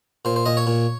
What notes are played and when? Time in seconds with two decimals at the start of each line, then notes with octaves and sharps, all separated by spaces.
0.25 A#2 C5
0.36 C5
0.46 A#2 D#5
0.57 C#5
0.67 A#2